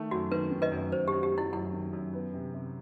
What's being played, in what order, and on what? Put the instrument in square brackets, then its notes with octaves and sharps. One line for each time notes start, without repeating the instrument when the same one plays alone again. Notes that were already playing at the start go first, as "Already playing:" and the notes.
Already playing: [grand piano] D#3 A3
[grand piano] F#2 [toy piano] F#4
[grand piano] D#3 [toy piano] B4
[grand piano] D#3
[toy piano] B4 D#5
[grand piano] F#2
[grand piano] F#2 [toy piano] C5
[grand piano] F#3 [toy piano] G4
[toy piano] G4
[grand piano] F#3
[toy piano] E4
[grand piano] F#2 [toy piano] E4
[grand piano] D#3
F#2
B3
C3
C3